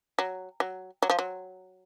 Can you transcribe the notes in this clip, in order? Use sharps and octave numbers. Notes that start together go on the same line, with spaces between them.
F#3
F#3
F#3
F3
F#3